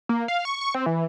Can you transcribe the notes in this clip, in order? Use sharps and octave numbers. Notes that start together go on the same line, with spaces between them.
A#3
F5
C#6
C#6
C4
E3